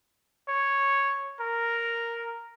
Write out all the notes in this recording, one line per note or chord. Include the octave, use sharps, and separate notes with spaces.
C#5
A#4